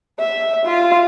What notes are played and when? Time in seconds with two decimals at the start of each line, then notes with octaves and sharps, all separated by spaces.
0.20 E5
0.66 F4